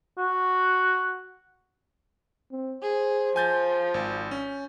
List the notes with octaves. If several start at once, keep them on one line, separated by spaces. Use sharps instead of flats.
F#4
C4
G#4 C5
F3 G#5 G6 A6
G#1
C#4